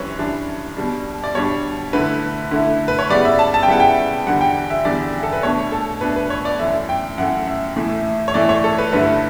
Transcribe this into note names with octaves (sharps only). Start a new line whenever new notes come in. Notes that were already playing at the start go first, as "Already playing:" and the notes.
Already playing: F#2 E3 G3 D4 B4 C#5
F#2 E3 G3 D4
B2 G3 D4
D5
B2 G3 D4 C#5
D3 A3 E4 B4
D3 A3 E4
B4
C#5
C#3 G3 B3 E4 D5
E5
A5
A5
G5
C#3 G3 B3 E4 F#5
G5
E2 D3 G3 F#5
G5
E5
E2 D3 G3 D5
A4
B4
B2 A3 D4 C#5
A4
B2 A3 D4 B4
B4
C#5
D5
F#2 E3 A3 E5
G5
F#2 E3 A3 F#5
E5
A2 E3 A3 E4
C#5
A2 E3 A3 E4 D5
C#5
A4
B4
G2 D3 A3 E4 B4